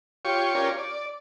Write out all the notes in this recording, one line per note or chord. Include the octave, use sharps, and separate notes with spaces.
F4 G4 C#5 C#6
C#4 F4 G4 A#4 C#5 D5
D5